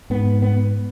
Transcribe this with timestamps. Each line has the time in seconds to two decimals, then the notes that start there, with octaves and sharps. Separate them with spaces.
0.10 G#2 B3
0.42 B3